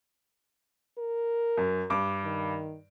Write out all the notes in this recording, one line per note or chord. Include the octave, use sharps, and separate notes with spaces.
A#4
F#2
G2 D6
D#3